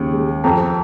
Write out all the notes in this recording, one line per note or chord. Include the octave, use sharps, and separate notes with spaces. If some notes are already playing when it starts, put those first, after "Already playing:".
Already playing: D#2 C#3
G#3
F2 G5 A#5